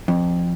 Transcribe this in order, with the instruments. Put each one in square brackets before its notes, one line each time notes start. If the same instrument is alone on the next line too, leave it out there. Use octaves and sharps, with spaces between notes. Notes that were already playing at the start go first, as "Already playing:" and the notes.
[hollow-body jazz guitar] F2